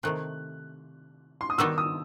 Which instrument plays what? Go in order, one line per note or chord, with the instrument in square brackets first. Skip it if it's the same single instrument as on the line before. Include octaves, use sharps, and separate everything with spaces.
[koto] C3 D#3 A3 C4 [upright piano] F#6
[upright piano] C6
D#6
[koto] D#3 G3 B3 D#4 F#4 [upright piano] E6
[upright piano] D#6